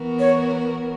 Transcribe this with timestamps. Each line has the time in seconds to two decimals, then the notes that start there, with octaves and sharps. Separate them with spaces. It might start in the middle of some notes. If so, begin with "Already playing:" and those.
Already playing: E3 B3 F#4 A#4
0.19 C#5